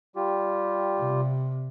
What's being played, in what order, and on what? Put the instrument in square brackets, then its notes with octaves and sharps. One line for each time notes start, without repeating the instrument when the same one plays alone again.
[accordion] G3 F4 G4
[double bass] C3